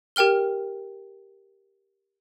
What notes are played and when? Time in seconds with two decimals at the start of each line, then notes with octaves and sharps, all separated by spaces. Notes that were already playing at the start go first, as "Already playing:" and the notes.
0.16 G4 A#4 G5 F6 G7